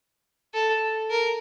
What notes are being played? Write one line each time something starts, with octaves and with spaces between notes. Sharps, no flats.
A4
A#4